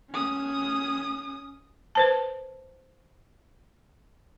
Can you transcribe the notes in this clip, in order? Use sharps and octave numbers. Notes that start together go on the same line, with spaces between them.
C#4 D#6
B4 C5 A5